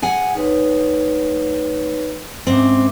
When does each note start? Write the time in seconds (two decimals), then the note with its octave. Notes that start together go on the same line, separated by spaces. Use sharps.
0.02 G#4 F#5 G#5
0.35 D2 D#4 B4 C#5
2.47 G#2 C4 C#4 E5 D6